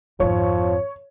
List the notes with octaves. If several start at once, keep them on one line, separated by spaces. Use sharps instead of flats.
G#1 F2 F3 C#5